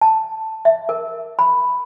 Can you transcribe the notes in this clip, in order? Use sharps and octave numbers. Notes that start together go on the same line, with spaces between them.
A5
E5
A#4
B5